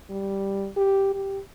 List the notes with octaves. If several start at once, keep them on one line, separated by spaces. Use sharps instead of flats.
G3
G4
G4